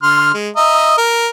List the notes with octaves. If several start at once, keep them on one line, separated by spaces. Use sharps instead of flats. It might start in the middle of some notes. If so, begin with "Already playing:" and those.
D3 C6 F6
G#3
D#5 E5 A#5
A#4